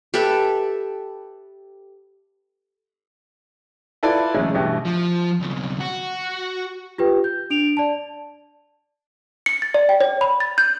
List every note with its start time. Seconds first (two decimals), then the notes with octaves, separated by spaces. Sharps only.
0.14 G4 A4 B4 E5
4.03 E4 F4 A4 B4 D5
4.34 A1 C#3 F#3 G#3 A3
4.54 G2 B2 E3 A3 G4
4.85 F3
5.40 B1 C#3
5.80 F#4
6.98 F4 G4 B4 G5
7.24 G6
7.50 D4 D7 F7
7.77 D5 A5
9.46 C#7
9.62 A6
9.74 D5
9.89 G5
10.01 C#5
10.21 B5
10.40 A6
10.58 G6